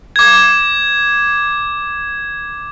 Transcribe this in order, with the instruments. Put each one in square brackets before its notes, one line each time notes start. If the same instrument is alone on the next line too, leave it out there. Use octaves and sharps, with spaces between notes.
[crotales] D6 G#6